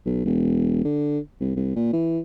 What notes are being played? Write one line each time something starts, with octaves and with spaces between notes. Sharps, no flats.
B1
E1
D3
C2
C2
A#2
E3